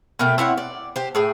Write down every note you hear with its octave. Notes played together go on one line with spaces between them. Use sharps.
B2 A3 A#4 G5
C4 E4 C#5 F#5
D5
G4 C5
A2 G#4 G5